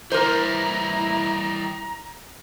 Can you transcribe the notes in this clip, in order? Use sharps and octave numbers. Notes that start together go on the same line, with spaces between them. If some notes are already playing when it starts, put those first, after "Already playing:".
E3 G3 E4 A#4 C5 A#5